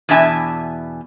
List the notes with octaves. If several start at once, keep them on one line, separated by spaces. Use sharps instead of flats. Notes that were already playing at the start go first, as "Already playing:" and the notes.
E2 B2 D4 E5 G#5 A5